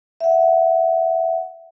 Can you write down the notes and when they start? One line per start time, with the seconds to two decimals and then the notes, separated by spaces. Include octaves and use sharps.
0.21 E5 F#5